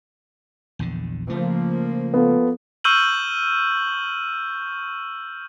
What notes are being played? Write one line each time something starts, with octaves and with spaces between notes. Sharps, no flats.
A#1 E2 D3
C#3 F3 A3 A#3
B3 F4 A4
C#6 E6 F6 G6 D#7 F#7